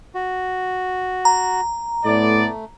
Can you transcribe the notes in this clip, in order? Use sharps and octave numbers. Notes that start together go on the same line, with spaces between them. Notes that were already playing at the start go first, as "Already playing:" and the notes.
F#4
A#5
A2 A3 B3 D5